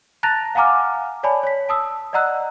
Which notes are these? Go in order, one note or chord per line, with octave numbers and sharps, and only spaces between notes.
A5 A#5 F#6 A6 A#6 F7
F5 F#5 G#5 A#5 D6 F6
C#5 D5 G#5 A5 B5
C#5 B6
A5 D#6 E6
D5 D#5 F#5 A#5 E6 F#6